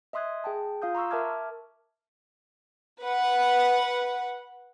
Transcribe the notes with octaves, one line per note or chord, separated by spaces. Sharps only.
D#5 E5 C6 D#6 F#6 G#6
G#4 G5 A5
F4 F5 D#6 G6
A#5 C6 C#6 E6
A#4 E5 A5 D6 F6 G#6
B4 F#5